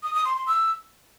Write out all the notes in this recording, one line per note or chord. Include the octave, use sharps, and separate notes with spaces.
D#6
D#6
C6
C6
E6